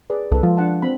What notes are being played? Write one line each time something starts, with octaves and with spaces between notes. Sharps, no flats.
G#4 B4 D5
C2 A4 B4
F3 G#3 F4
D4 F#5 A5
C4 B5